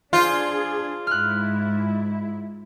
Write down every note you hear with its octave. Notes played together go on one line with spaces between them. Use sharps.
D4 F4 G#4 C5
G#2 E4 F6 F#6